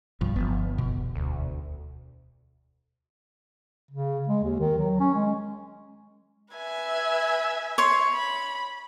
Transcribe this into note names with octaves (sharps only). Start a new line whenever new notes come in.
B1 G2 F3
G1 F3 B3
E1 B2
D2
C#3
G#3
D#2
D#3
F#3
C#4
G#3
B4 E5 G#5
C#5 C6
B5